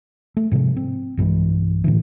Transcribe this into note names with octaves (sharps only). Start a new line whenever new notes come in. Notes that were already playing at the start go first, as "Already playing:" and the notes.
A3
G#2 C3 F3 G#3
C4
B1 G2 E3 G#3
A2 D3 E3